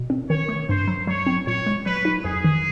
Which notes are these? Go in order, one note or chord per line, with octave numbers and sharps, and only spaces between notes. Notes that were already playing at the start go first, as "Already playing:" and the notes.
Already playing: B2
C4
D#3 C#5
A3
G2 C5
F#3
F#3 C#5
C4
A#2 C#5
G#3
F#3 B4
D#4
F2 G#4
D#3